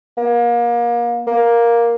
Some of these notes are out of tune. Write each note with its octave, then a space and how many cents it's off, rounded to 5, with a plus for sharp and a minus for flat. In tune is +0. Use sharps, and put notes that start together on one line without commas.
A#3 +30
A#3 +5